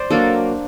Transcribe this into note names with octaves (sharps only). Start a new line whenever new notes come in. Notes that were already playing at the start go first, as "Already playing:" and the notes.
Already playing: C5 D5
F#3 A#3 D4 A4